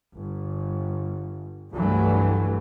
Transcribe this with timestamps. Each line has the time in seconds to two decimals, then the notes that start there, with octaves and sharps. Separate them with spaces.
0.14 G1
1.73 C2 G2 E3 F#3 A3